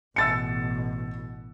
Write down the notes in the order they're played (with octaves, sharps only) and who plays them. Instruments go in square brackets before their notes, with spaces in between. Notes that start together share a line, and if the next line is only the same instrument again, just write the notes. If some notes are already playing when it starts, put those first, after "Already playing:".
[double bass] A1 B2 [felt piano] E6 A6 C#7